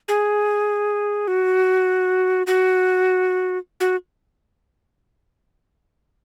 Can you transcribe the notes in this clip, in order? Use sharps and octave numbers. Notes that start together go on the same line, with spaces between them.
G#4
F#4
F#4
F#4